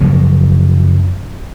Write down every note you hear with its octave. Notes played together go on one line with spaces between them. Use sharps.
F#2 C#3 F3 F#3